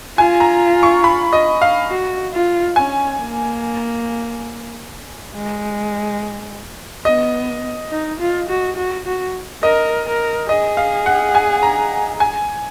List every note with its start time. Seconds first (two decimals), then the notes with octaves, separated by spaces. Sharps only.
0.18 F4 G#5
0.40 A#5
0.83 C#6
1.04 B5
1.33 D#5
1.62 F5
1.90 F#4
2.33 F4
2.76 C#4 G#5
3.19 A#3
5.34 G#3
7.05 B3 D#5
7.92 D#4
8.20 F4
8.49 F#4
8.76 F#4
9.06 F#4
9.63 A#4 D#5
10.06 A#4
10.49 G#4 D#5
10.77 F5
11.06 F#5
11.35 G#5
11.63 A#5
12.20 G#5